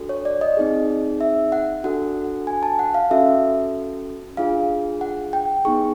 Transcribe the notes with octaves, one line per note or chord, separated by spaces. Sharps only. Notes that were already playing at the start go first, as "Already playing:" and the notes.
Already playing: D4 F#4 A4
C#5
D5
D#5
C4 D#4 G#4
E5
F#5
D4 F#4 A4 F#5
G#5
A5
F#5
F5
C#4 F#4 A4 E5
D4 F4 G#4 F5
F#5
G5
B3 D#4 G#4 C#6